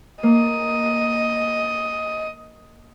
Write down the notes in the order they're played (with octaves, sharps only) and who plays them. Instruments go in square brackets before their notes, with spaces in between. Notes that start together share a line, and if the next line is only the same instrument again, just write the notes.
[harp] A#3 [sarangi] D#5